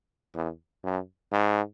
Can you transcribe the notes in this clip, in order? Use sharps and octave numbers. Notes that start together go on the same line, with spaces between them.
E2
F#2
G#2